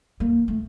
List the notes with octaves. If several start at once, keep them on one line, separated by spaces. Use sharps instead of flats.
A#3
A3